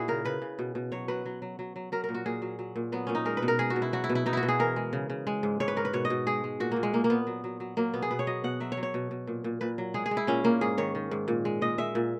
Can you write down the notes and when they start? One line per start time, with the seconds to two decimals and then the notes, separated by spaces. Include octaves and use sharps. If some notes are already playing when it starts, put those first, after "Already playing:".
Already playing: A#2 E4 F#4 G#4
0.08 C#3 A#4
0.25 C#3 B4
0.42 C#3
0.59 B2
0.75 B2
0.92 F#3 C#5
1.08 F#3 B4
1.26 F#3
1.42 F#3
1.59 F#3
1.76 F#3
1.92 F#3 A#4
2.04 A#4
2.09 A#2
2.14 F#4
2.26 A#2 G#4
2.42 F#3
2.59 F#3
2.76 A#2
2.92 F#3 B3
3.07 A#2 C#4
3.15 D#4
3.25 G#3 A#4
3.37 B4
3.42 B2
3.48 A#4
3.59 G#3 G#4
3.70 F#4
3.76 B2
3.82 E4
3.93 F#3 F#4
4.04 E4
4.09 B2
4.15 E4
4.26 B2 D#4
4.33 E4 F#4
4.43 B2
4.48 G#4
4.59 E3 A#4
4.76 G#3
4.93 C#3
5.10 C#3
5.27 G#3
5.43 G#2
5.60 G#2 C#5
5.68 B4
5.77 G#2 A#4
5.85 B4
5.93 B2 C#5
6.05 D#5
6.10 B2
6.27 G#3 G#4
6.44 G#3
6.60 A#2 F#4
6.72 A#2 A#3
6.83 G#3
6.93 A#2 A#3
7.04 A#3
7.10 A#2 B3
7.27 F#3
7.44 F#3
7.60 F#3
7.77 F#3 A#3
7.94 B2 B3
8.02 G#4
8.11 B2 B4
8.19 C#5
8.27 F#3 D#5
8.44 B2 F#5
8.60 F#3 E5
8.72 C#5
8.77 F#3
8.83 C#5
8.94 B2
9.11 B2
9.27 A#2
9.44 A#2
9.61 A#2 B4
9.78 F#3
9.94 G#3 G#4
10.06 G#4
10.11 G#3
10.17 E4
10.27 A#2 C#4
10.44 A#2 A#3
10.61 G#2 G#4
10.78 D#3 C#5
10.95 D#3
11.11 G#2
11.28 A#2
11.45 G#3
11.62 A#2 D#5
11.78 G#3 E5
11.95 A#2